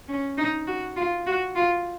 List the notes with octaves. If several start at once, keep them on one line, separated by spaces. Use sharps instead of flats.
C#4
D#4
F#4
F4
F#4
F4